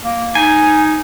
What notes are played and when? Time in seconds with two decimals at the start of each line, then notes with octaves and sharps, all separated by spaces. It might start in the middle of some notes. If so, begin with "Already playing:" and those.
0.03 A#3
0.35 D#4 G#5